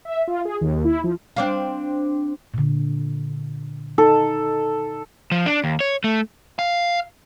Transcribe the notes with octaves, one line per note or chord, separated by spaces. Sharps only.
E5
F4
G#4
D#2
E4
F3
C4 D4 F5
A#2 D3
D#4 A4
F3
D4
D#2
C#5
A3
F5